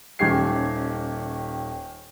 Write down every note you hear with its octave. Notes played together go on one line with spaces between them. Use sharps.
D#1 D#3 C#4 G4 G#6 C7